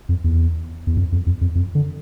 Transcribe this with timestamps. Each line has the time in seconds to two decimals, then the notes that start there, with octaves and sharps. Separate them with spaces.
0.09 F2
0.24 E2
0.87 E2
0.97 F2
1.12 F2
1.26 F2
1.41 F2
1.55 F2
1.75 D3